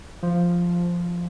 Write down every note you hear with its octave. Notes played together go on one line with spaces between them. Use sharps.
F3